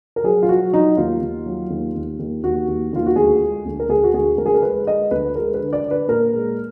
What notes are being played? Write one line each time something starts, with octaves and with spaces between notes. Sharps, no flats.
A#4
F#3 G#4
F4
F#3 F#4
F#3 D#4
D#2 F4
D#2
F#3
D#2
D#2
D#2
D#2 F#4
D#2
D#2 F4
F#4
D2 G#4
G#3
D2
A#4
D2 G#4
F#4
D2 G#4
D2 A#4
G#4
A#4
G#3 B4
G#3 D#5
D2 B4
G#3 A#4
B4
D3
D5
D3
B4
A#2 A#4
G#3